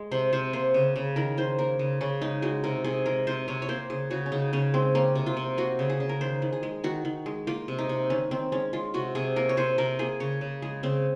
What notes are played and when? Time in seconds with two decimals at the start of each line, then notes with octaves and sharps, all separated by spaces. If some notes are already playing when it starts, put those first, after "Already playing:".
Already playing: G#3
0.11 C3 C5
0.33 C3 C5
0.53 A#3 C5
0.74 C#3
0.96 C#3
1.16 D#3 A#4
1.37 D#3 C5
1.58 A#3 A#4
1.79 C#3
2.01 C#3 C#4
2.21 G#3 D#4
2.42 G#3 F#4
2.64 C3 A#4
2.84 C3 G#4
3.06 G#3 A#4
3.27 C3 C5
3.48 C3 C#5
3.62 C#5
3.69 A#3 C5
3.90 C#3 G#4
4.10 C#3 F#4
4.26 C#4
4.32 C#3 D#4
4.53 C#3 C#4
4.74 G#3 C4
4.95 A#3 C#4
5.15 C3
5.26 F4
5.37 C3
5.58 A#3 F#4
5.79 C#3
5.90 G#4
6.00 C#3
6.09 A#4
6.21 D#3 C5
6.42 D#3
6.53 G#4
6.63 G#3
6.84 D#3 F#4
7.05 D#3
7.26 G#3
7.47 A#3 F4
7.68 C3
7.79 D#4
7.89 C3
8.10 D#3 C#4
8.31 D#3 C4
8.52 G#3 C#4
8.73 G#3 F4
8.94 C3 F#4
9.15 C3 G#4
9.36 A#3 A#4
9.49 C#5
9.57 C3 C5
9.78 C3 A#4
9.99 A#3 G#4
10.20 C#3 C#5
10.41 C#3
10.62 G#3 G#4
10.83 C#3 C4